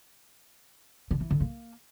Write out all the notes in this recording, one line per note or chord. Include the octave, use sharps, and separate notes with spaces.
D3
E3
D3
A#3